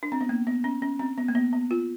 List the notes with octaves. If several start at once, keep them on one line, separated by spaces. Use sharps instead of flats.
D4
C4
B3
A#3
B3
C#4
C#4
C4
B3
A#3
B3
B3
F4